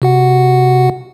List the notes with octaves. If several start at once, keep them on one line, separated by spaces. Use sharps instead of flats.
C3 F#4 F#5